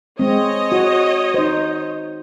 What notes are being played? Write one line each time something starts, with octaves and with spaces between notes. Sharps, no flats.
G#3 C4 C#5 D#5
F#4
D#4 C5